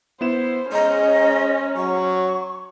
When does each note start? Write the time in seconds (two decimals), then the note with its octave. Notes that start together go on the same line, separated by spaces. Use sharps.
0.21 B3 E4 C5 E7
0.72 G#3 C#4 C5 D#5 A#5
1.76 F#3 C#6